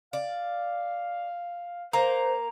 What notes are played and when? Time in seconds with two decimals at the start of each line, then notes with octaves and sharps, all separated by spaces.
0.13 D5 F5
1.93 A#3 C5 A#5